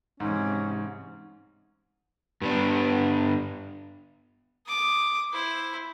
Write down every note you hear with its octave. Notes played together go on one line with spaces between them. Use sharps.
G#2 C3 E3 C#4
G2 B3 D4
D6 D#6
E4 C5